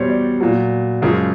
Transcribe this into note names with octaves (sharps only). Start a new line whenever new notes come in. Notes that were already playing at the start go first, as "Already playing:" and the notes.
Already playing: E2 B2 G3 C5 C#5
D5
A#2 F#3
F#2 C#3 F3 G#3